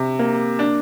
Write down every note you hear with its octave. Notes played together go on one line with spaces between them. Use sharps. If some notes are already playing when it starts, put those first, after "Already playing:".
Already playing: C3
A#3
D4